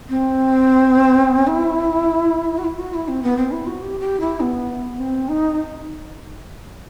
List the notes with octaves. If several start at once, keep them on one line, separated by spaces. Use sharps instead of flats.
C4
E4
F#4
E4
F#4
E4
C4
B3
C4
E4
F#4
G4
G4
E4
B3
C4
D#4